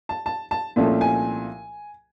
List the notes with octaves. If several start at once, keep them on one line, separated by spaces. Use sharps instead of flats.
A5
A5
A5
C2 A#2 F3 A3 C#4
G#5